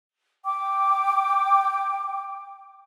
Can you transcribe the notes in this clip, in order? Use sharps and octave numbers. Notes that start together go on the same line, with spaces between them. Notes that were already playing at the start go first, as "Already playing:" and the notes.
G5 D6